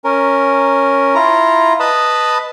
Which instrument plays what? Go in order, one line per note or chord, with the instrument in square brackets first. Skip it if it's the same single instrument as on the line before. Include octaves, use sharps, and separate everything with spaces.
[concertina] C#4 A#4
E4 F4 A#5
B4 D#5 A5 B5